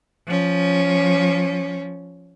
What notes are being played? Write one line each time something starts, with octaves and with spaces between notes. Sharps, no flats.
F3 C#4